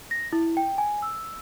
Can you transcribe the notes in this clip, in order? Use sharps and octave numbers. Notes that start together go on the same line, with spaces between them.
A#6
E4
G5
G#5
E6